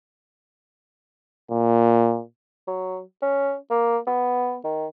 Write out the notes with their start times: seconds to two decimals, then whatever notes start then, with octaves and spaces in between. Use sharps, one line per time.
1.51 A#2
2.68 F#3
3.22 C#4
3.70 A#3
4.07 B3
4.64 D#3